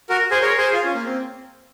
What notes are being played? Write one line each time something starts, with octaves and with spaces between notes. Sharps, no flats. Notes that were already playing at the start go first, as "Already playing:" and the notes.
F#4 A#4
G#4 C5
A#4 C#5
G#4 C5
F4
C#4
A#3
C4